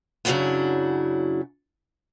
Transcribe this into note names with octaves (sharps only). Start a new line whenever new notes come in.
F#2 C#3 E3 F#3 D4 E4